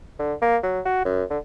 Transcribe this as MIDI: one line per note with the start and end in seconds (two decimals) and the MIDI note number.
0.20 0.34 50
0.42 0.57 58
0.63 0.80 54
0.85 1.04 66
1.05 1.24 42
1.30 1.38 50